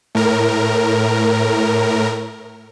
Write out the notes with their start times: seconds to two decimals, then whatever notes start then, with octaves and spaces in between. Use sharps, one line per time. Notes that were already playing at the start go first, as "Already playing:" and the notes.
0.15 A2 A#4